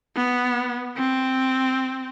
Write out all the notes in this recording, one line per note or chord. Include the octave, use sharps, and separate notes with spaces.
B3
C4